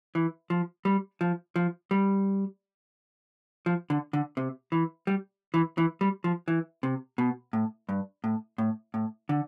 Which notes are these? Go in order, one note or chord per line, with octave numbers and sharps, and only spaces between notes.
E3
F3
G3
F3
F3
G3
F3
D3
D3
C3
E3
G3
E3
E3
G3
F3
E3
C3
B2
A2
G2
A2
A2
A2
D3